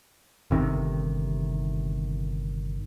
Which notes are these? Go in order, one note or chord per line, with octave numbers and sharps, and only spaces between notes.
G1 C3 D#3